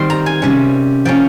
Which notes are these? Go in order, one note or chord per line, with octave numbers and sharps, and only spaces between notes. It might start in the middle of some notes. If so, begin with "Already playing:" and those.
Already playing: D#3 G3 C4 C6
A#5
G#5
C3 G3 C#4
F3 A#3 C#4 G5